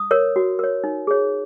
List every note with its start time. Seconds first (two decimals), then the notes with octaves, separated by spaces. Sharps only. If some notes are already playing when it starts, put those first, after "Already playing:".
Already playing: D#6
0.11 A#4 C#5
0.36 F#4
0.59 A#4 C#5
0.84 D#4
1.07 G#4 C#5